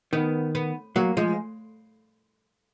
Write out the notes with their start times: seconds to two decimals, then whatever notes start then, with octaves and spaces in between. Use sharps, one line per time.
0.13 D#3 B3
0.55 B3
0.96 F#3 A#3
1.17 F3 G#3